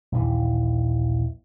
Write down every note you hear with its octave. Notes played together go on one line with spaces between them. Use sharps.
A#1 D#2 E3